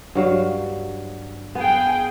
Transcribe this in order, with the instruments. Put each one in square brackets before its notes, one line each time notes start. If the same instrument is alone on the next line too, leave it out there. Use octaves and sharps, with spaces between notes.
[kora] G2 F#3 F5
[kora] B3 [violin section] G#4 F5 G5